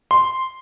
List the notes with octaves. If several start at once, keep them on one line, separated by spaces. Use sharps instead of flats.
C6